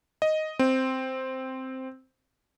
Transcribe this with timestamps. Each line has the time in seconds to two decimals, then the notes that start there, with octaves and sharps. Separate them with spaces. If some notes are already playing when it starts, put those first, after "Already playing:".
0.22 D#5
0.59 C4